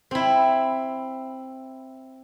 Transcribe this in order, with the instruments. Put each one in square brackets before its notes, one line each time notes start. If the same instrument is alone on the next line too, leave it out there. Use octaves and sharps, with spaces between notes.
[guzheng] C4 E4